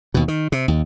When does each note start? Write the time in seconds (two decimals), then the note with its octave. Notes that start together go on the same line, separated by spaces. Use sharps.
0.14 D#2 B2
0.28 D#3
0.52 C3
0.68 D#2